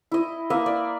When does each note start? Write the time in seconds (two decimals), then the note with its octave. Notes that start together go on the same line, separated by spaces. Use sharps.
0.12 E4 D#5
0.50 A#3 B4 D#5 E5
0.66 D5